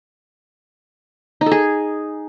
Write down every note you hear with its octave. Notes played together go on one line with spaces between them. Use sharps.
D#4
A4
G#4